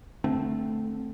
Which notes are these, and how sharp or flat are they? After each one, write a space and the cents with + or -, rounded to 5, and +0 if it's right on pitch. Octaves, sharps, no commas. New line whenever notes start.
D3 +0 A3 +0 C4 +0